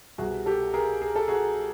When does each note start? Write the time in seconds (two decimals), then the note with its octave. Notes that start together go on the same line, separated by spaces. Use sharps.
0.18 C2 B2 G3 F#4 G#4
0.46 G4 A4
0.74 G#4 A#4
1.02 G#4
1.16 A4
1.28 F#4 G#4